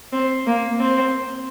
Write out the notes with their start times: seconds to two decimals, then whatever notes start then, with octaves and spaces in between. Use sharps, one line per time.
0.13 C4
0.47 A#3
0.80 C4